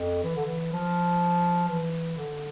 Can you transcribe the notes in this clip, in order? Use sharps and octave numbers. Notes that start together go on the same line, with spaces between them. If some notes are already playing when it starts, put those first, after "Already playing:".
Already playing: F2
E3
D3
E3
F3
E3
D3